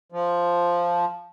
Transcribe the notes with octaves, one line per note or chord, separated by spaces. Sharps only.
F3